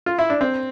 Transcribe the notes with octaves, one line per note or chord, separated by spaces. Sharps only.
F4
E4
D4
C4